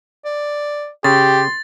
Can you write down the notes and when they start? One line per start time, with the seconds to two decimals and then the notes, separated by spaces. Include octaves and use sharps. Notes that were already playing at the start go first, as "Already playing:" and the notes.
0.25 D5
1.04 C#3 G4 C6 A6